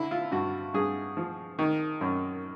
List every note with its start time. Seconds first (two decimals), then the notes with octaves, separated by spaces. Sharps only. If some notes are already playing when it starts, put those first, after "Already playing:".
Already playing: D3 E4
0.11 F4
0.31 G2 F#4
0.74 G2 G#4
1.17 F3
1.59 D#3
2.01 F#2